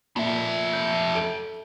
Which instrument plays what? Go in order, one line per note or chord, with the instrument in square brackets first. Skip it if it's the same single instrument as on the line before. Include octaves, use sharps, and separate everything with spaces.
[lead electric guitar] F2 E5 [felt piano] A#2
[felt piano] G6
A4 D7